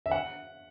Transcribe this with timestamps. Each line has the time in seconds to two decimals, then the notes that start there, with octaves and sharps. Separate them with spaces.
0.06 E5
0.11 F#5